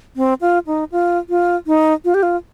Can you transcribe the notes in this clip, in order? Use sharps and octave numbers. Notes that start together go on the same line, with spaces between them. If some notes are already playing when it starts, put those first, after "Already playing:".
C4
F4
D#4
F4
F4
D#4
F4
G4
F4